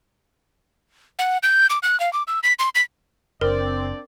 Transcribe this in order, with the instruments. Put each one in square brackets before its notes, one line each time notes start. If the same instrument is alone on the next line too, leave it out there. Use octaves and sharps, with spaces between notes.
[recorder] F#5
G6
D6
F#6
F5
D6
E6
B6
C6
B6
[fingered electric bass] F#1 [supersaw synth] C4 [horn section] D4 D5 [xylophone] A#4